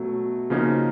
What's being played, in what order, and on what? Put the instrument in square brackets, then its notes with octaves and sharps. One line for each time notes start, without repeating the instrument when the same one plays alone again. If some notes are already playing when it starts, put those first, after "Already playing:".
Already playing: [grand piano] B2 F#3 A3
C#3 F3 A#3 D#4 F#4